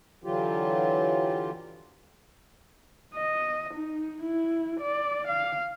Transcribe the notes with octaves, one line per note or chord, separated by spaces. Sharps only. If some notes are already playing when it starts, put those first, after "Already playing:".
D3 E3 F#3 F4 G4
D#5
D#4
E4
D5
F5